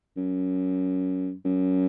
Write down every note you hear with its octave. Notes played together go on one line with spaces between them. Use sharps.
F#2
F#2